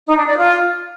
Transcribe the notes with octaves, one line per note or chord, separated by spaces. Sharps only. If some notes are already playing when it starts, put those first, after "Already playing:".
D#4
D4
D5
F4